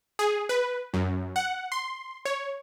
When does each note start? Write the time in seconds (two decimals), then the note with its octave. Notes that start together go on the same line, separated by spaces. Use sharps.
0.19 G#4
0.49 B4
0.94 F#2
1.36 F#5
1.72 C6
2.25 C#5